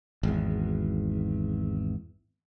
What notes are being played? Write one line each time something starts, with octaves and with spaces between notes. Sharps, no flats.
G#1 E2